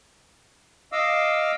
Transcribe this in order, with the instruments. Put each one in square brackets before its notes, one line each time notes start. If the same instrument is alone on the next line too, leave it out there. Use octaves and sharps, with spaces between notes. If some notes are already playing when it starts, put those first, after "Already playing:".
[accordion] D#5 F5 D6 E6